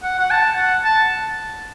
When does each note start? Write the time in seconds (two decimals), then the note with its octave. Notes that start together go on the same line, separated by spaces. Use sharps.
0.03 F#5
0.19 F#5
0.31 A5
0.56 F#5
0.84 A5